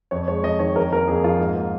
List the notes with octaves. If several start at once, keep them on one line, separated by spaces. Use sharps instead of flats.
F2 C#5
G#3 C#5
F2 D#5
D#3 C#5
F2 A#4
A#3 A#4
F2 G#4
F3 F4
G#2
A#3